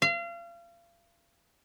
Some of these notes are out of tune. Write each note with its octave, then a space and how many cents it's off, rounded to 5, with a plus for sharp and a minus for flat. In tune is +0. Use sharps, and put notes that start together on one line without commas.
F5 -35